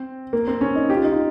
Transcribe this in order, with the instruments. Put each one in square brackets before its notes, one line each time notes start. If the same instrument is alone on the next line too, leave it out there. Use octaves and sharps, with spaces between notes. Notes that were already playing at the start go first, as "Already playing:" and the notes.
Already playing: [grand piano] C4
A#3
C4
C#4
D#4
G4
F4
D#4
F4